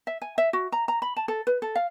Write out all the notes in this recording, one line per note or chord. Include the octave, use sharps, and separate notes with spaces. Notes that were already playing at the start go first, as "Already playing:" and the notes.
E5
G#5
E5
F#4
A#5
A#5
B5
A5
A4
B4
A4
F5